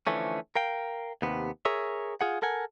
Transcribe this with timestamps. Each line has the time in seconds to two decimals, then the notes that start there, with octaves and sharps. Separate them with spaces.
0.07 D3 E3 F3 A3 C#4
0.56 A#4 F5 G5
1.22 D#2 C3 B3
1.65 G#4 A#4 C#5 E5
2.21 F4 G#4 F#5
2.42 A4 A#4 F#5 G#5